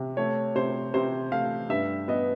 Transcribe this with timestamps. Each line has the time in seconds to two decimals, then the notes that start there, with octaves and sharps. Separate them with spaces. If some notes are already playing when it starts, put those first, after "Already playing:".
Already playing: C3
0.17 A3 C#5
0.56 C3 C5
0.94 C3 C5
1.32 A3 F5
1.69 G2 E5
2.08 B3 D#5